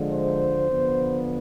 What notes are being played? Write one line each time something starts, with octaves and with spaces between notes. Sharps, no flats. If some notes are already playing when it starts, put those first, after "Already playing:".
Already playing: D3 F3 G#3
C5
D3 F3 B3